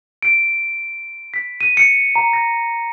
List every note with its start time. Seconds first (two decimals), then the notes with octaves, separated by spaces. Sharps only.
0.23 D7
1.34 B6
1.61 D#7
1.77 C#7
2.16 A#5
2.33 A#6